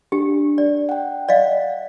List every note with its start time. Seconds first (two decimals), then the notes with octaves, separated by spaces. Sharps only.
0.12 D4 G4
0.58 D5
0.89 F#5 G5
1.29 D5 D#5 F5 F#5